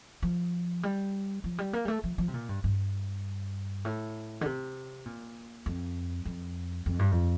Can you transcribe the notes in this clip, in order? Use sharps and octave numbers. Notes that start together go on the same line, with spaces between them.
F3
G3
F3
G3
A#3
G3
A3
F3
F3
C3
A#2
G2
G2
A2
D3
C3
A#2
F2
F2
F2
G2
F2